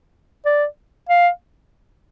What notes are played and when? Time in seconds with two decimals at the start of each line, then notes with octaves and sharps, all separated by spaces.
0.45 D5
1.09 F5